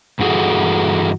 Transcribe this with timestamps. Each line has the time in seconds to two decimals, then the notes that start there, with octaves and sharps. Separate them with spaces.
0.19 G2 E3 F#4 G#4 A4